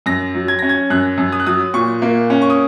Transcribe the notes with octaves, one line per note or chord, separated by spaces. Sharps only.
F#2 A#6
F#3
G#6
C#4 A#6
G#6
F#2 F#6
F#2
D#6
F#6
F#3 D#6
A#2 C#6
A#3
C#4
C#6
D#6